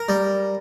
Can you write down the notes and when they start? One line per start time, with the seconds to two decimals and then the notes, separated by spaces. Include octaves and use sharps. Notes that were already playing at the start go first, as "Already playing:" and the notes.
Already playing: A#4
0.09 G3